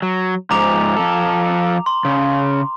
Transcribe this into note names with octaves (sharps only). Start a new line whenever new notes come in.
F#3
G#2 F3 A#5 D6 F7
F3 A4
C6
C#3